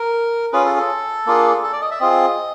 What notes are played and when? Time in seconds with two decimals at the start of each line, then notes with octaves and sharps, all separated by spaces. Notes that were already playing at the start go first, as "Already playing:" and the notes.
Already playing: A#4
0.53 C#4 F4 G#4 B4
0.65 A4
0.77 A4
1.26 A#3 D4 F4 G#4
1.64 A4
1.73 D5
1.81 D#5
1.91 E5
2.00 C4 F4 G#4 D#5